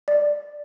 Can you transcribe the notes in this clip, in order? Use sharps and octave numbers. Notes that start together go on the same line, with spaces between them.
D5